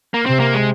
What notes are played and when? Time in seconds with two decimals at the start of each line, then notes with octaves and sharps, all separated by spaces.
0.14 A#3
0.25 C3 C4
0.40 A#3
0.53 G#3